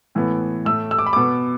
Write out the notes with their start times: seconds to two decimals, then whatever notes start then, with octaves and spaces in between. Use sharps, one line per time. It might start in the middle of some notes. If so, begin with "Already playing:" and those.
0.15 A2 E3 B3
0.65 A2 A3 E6
0.91 E6
0.99 D6
1.06 B5
1.13 B2 B3 D6